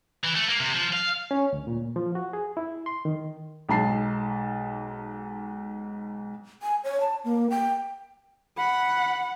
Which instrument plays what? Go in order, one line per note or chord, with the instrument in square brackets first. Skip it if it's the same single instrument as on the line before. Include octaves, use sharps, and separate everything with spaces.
[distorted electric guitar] E3
A3
A#3
C3
F3
F5
[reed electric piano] C#4
D2
A#2
F3
F#4
G#4
E4
C6
D#3
[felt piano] B1 G#2 A5 C7
[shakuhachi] G#5
C#5
A5
A#3
G5
[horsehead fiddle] F#5 [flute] B5